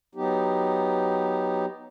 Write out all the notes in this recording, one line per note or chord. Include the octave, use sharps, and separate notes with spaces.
F#3 B3 D#4 G4